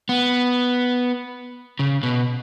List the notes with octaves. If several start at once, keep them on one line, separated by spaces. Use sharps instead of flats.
B3
C#3
B2